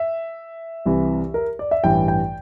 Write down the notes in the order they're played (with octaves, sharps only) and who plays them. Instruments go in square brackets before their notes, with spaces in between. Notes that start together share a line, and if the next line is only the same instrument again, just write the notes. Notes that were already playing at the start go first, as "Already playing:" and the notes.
Already playing: [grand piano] E5
C2 C3 E3
A#4
D5
E5
A1 G2 E3 G5
G5